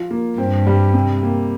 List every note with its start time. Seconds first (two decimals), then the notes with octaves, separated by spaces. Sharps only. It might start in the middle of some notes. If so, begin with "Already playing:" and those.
Already playing: F3 F4
0.11 A#3
0.38 G2 C4
0.67 G3
0.94 C3
1.23 A#3